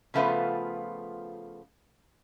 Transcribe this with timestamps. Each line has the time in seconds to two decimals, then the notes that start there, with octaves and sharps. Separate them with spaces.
0.14 C#3 F3 A3 B3 F4 B4